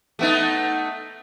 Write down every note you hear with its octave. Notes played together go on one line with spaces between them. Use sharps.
A3 B3 D#4